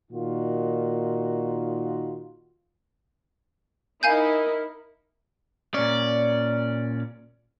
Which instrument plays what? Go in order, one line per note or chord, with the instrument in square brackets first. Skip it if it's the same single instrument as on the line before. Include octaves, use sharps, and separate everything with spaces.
[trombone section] A#2 D#3 D#4 F4 F#4
[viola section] D#4 E4 [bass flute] A#4 [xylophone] F5 G#5 G6
[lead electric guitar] A#2 C#4 [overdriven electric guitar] D5